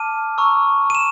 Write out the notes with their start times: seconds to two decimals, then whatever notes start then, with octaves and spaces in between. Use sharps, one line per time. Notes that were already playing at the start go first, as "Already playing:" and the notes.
Already playing: A5 D6 F6 D#7
0.38 A#5 C#6 E6
0.90 D#7
0.95 E7